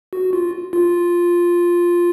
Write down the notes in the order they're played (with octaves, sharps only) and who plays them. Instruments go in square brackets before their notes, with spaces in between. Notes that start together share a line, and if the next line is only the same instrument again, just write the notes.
[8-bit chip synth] F#4
F4
F4